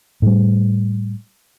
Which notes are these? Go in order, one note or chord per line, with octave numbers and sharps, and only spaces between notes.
A2 G3